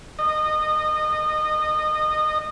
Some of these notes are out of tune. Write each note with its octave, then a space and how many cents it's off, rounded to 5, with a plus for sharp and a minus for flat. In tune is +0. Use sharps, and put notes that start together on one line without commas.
D#5 -20